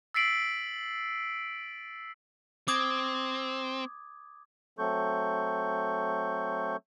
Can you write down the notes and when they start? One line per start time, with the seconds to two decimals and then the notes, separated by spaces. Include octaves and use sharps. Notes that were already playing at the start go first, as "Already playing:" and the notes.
0.14 E6 A6 B6 C7 D7 F#7
2.68 C4 D6 D#6 G#6
4.79 F#3 A3 C4 A4 C#6 G6